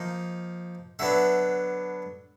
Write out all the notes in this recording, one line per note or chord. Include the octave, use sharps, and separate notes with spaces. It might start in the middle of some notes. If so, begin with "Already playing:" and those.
Already playing: F3 A#3 D#4
D3 F#3 B3 D4 E5